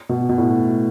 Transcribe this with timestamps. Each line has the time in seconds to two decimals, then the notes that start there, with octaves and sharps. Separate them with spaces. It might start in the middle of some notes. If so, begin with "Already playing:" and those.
0.09 B2
0.29 B2
0.38 A2